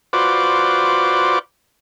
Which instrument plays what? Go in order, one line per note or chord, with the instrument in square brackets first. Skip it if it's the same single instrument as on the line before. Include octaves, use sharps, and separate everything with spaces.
[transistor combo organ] F4 F#4 B4 C5 D5 D6